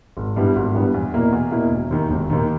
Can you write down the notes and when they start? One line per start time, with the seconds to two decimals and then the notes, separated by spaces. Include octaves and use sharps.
0.17 G#1
0.36 G2 G3 B3 E4
0.56 G#1
0.74 G2 G3 B3 E4
0.94 E2
1.14 B2 A#3 E4
1.32 E2
1.52 B2 A#3 E4
1.71 E1
1.91 D#2 D#3
2.10 E1
2.30 D#2 D#3